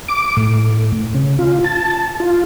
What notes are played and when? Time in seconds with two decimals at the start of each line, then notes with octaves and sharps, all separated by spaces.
0.08 D6
0.37 A2
1.15 C#3
1.39 F4
1.64 A5
2.20 F4